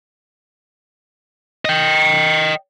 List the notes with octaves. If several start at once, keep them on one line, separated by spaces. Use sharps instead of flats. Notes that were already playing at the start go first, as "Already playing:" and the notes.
D#5 G5